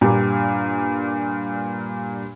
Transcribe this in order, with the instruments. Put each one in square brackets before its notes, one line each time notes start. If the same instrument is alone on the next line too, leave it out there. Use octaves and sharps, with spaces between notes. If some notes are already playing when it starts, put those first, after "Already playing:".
[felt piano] G2 A#2 A#3 D4 G4